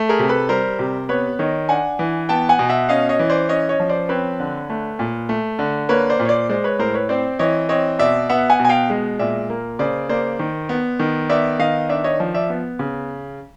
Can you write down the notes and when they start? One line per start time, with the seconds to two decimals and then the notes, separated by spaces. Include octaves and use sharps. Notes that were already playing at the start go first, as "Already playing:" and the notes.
Already playing: A3
0.09 G#4 A#4
0.19 C3
0.29 A4 B4
0.49 G3 A#4 C5
0.79 C3
1.09 B3 B4 C#5
1.39 D#3 C#5 D#5
1.69 D4 F#5 G#5
1.99 E3
2.29 B3 G5 A5
2.49 F#5 G#5
2.59 B2
2.69 E5 F#5
2.89 C#4 D#5 F5
3.09 C#5 D#5
3.19 E3
3.30 C5 D5
3.49 C#4 C#5 D#5
3.69 C#5 D#5
3.80 F3
3.89 C5 D5
4.09 C4 B4 C#5
4.40 D3
4.70 A3
4.99 A#2
5.29 A3
5.59 D3
5.89 A#3 B4 C#5
6.10 C5 D5
6.20 A#2
6.25 C#5
6.29 C5 D5
6.49 G#3 C5 D5
6.64 B4 C#5
6.79 A2 A#4 C5
6.94 B4 C#5
7.09 C4 C5 D5
7.39 E3 C#5 D#5
7.69 C4 C#5 D#5
7.99 B2 D5 E5
8.29 B3 E5 F#5
8.50 F#5 G#5
8.59 B2
8.65 G#5
8.69 F5 G5
8.90 G#3
9.19 A#2 D5 E5
9.50 A#3
9.79 C#3 C5 D5
10.09 A#3 C5 D5
10.39 D#3
10.69 B3
10.99 D#3
11.29 B3 D5 E5
11.59 D#3 D#5 F5
11.89 D4 D5 E5
12.04 C#5 D#5
12.20 F3
12.34 D5 E5
12.49 B3
12.79 C#3